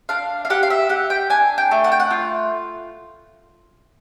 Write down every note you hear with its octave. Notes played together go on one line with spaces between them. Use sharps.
D4 F5
F5
G4 F#5
F5
E5
G4 F#5
G5
D4 G#5
G5
A3
F#5
G5
F#5
F4